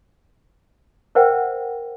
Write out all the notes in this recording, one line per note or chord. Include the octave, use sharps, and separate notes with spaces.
A#4 C5 E5 F#5 G5